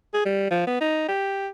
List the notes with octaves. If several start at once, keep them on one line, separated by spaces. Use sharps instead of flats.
G#4
G3
F3
B3
D#4
G4